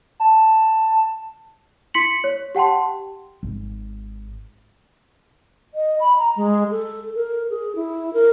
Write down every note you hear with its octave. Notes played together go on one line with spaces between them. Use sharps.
A5
E4 C6 B6 C#7 F#7
C#5
G4 F#5 G5 A5 C6
G#1
D#5
B5
A#5
G#3
A4
A#4
G#4
E4
A#4